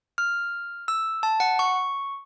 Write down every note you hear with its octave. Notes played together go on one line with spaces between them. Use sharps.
F6
E6
A5
F#5
C#6